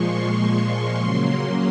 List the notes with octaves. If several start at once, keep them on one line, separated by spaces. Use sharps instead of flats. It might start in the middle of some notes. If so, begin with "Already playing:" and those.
Already playing: A#2 F3 G#3 C6 C#6
C#6
C#3 F#3 A#3 C6
C6